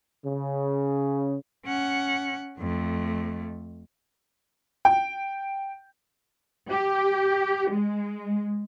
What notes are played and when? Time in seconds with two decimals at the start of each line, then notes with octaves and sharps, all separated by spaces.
0.25 C#3
1.66 C#4 F#5
2.59 F2 A3
4.85 G5
6.70 G4
7.72 G#3